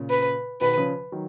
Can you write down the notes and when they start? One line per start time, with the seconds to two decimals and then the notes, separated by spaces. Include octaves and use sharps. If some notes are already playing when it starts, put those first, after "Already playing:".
Already playing: A#2 C#3
0.10 B4
0.61 B2 D#3 B4
0.77 C#3 F3
1.12 D#3 F#3